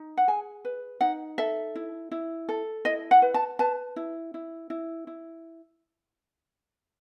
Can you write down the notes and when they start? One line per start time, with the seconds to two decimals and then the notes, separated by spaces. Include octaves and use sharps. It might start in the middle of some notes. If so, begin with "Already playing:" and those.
Already playing: D#4
0.17 F#5
0.28 G#4 G#5
0.65 B4
1.01 D#4 F#5
1.38 A4 E5
1.76 E4
2.11 E4
2.49 A4
2.85 E4 D#5
3.11 F#5
3.22 B4
3.34 A5
3.59 B4 A5
3.96 E4
4.34 E4
4.70 E4
5.07 E4